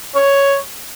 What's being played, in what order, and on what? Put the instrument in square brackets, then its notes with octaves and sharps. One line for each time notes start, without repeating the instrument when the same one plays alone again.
[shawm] C#5